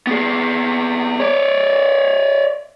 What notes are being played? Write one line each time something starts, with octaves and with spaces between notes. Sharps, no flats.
B3 G#4
C#5 D5